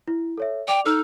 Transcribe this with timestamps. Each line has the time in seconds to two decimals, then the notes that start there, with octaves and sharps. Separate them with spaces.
0.08 E4
0.38 A4 C#5 E5
0.68 D5 G5 D6 F7
0.85 D#4 A4 E6 F6